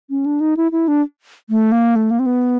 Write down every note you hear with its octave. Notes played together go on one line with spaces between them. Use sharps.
C#4
D4
D#4
E4
E4
D4
A3
A#3
A3
A#3
C4
B3